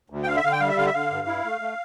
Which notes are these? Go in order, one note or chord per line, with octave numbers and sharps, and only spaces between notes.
D2
G5
D3 F5
E5
D3 F5
G5
G3 F5
E5
D3 F5
E5
D3 F5
G2
E4
A3
A3